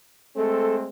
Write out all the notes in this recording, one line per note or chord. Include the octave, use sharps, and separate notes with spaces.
G#3 A3 C4 A4